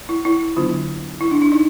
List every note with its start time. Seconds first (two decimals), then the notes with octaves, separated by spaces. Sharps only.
0.09 E4
0.25 E4
0.57 D3 F#3 B3 D4 F4
1.21 E4
1.31 D4
1.42 D4
1.52 D#4